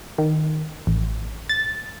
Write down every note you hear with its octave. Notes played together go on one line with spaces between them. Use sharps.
D#3
A1
A6